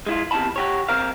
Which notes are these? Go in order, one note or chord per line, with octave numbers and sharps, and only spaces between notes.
G#3 E4 F4
E2 C3 D#3 E4 A5 B5
F#4 G4 C#5
C4 A#4 F5